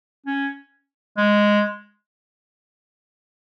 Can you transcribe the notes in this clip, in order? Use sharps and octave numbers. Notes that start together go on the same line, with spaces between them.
C#4
G#3